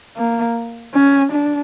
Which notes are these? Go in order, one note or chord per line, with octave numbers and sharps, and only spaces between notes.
A#3
C#4
D4